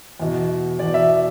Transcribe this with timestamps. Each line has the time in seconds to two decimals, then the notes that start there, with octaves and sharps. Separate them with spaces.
0.20 E2 B2
0.79 E2 B2 D5
0.94 E5